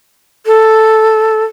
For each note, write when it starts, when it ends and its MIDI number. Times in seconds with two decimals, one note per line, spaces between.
0.46 1.43 69